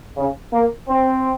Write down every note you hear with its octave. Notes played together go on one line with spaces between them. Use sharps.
C#3
A#3
C4